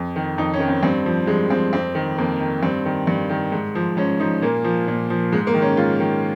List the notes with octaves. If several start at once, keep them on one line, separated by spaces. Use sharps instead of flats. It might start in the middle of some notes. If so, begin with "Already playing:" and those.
Already playing: F2
D#3
F2 D#4
C#4
D#3
C4
G2 C4
F3
G2 G#3
F3 C4
F2 C4
D#3
F2 A#3
D#3
G2 C4
D#3
G2
D#3
G#2
F3
G#2 C#4
F3 D#4
A#2 A#3
F3
A#2
F3
G#2 G#3
A#3
D#3
C#4
G#2 F4
D#3